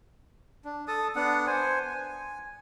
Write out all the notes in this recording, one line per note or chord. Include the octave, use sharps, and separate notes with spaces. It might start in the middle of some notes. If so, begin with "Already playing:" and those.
D4
A4 A5 D#6
B3 D4 F#5
C5 G#5
G#5